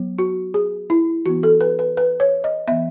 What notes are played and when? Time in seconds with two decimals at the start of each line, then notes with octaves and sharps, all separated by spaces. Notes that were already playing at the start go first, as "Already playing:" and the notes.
Already playing: F#3 B3
0.19 F#4
0.54 G#4
0.90 E4
1.26 E3 B3 F#4
1.43 A4
1.61 B4
1.79 B4
1.97 B4
2.20 C#5
2.44 D#5
2.67 E3 B3 E5